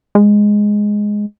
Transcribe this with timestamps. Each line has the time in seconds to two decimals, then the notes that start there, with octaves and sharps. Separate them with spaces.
0.15 G#3